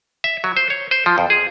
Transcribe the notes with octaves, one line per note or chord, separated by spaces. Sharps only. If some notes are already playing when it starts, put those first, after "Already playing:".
E5
F#3
C5
C#5
C5
F3
F2
G#4